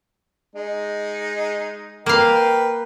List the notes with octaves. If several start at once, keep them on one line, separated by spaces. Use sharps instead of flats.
G#3 D#4
A#3 B4 F5 G5